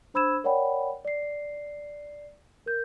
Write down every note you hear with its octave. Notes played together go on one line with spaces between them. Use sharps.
D4 C5 B5 E6 G#6 E7
A#4 C#5 D5 F#5 G5 B5
D5 C7
A#4 G6